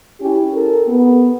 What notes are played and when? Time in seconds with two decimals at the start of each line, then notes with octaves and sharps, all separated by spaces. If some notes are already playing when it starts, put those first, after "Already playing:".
0.20 C#4 E4 G4
0.54 A4 A#4
0.87 B3